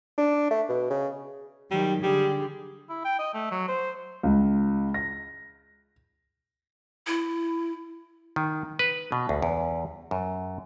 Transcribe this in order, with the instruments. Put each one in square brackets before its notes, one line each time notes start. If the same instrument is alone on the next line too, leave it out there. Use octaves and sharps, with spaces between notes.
[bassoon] D4
A3
B2
C#3
[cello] D#3 F#3 [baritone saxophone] G3
[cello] D3 [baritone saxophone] G3 [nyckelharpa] G4 G#4
[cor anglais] E4
G5
D#5
A3
F#3
C5
[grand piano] C#2
A#6
[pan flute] E4
[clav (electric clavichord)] D#3
B4
B2
D2
E2
F#2